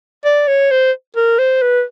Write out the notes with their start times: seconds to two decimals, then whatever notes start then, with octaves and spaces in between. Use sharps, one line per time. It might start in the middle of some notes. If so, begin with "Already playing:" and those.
0.25 D5
0.48 C#5
0.71 C5
1.16 A#4
1.39 C5
1.62 B4